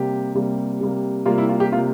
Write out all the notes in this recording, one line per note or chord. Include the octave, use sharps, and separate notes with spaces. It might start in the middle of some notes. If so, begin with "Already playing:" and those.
Already playing: C3 G3 A#3 G4
C3 G3 A#3
C3 G3 A#3
C3 G3 A#3 F4
E4
F4
G4
C3 G3 A#3 F4